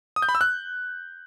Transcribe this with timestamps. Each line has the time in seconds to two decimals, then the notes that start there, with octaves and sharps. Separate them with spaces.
0.16 D#6
0.22 G6
0.29 B5
0.35 E6
0.41 F#6